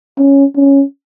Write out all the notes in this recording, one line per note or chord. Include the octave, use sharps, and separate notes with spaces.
C#4
C#4